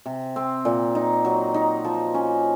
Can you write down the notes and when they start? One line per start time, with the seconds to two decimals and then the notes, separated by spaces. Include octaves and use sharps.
0.06 C3
0.36 C4
0.65 A#2
0.95 D#4
1.25 F#3
1.54 D#4
1.84 F3
2.14 C#4